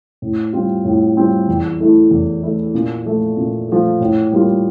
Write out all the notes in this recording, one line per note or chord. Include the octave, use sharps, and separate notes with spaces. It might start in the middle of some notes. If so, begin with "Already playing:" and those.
A2
G3 C4 F4
A2
G3 C4 F4
E2
E3 A3 E4
E2
E3 A3 E4
A#2
F3 A3
A#2
F3 A3
A2
G3 A#3 F4